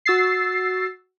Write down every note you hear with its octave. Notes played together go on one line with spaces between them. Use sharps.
F#4 E6 A6 C7